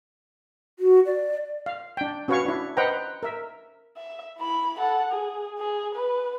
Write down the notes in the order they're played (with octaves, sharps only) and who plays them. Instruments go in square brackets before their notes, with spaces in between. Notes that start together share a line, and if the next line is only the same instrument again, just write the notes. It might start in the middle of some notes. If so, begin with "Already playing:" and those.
[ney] F#4
D5
[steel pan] F5
D4 G5
C#4 F#4 B4 C#5 F5 C#6
D4 E4
B4 C5 D#5 F#5 G5 A#5
A#4 E5
[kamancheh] E5
E4 B5
A4 F#5
G#4
G#4
B4